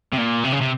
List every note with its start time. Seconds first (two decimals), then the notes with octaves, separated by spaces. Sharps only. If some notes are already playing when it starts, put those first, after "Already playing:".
0.13 C3
0.18 A#2
0.44 C3
0.53 C#3
0.61 C3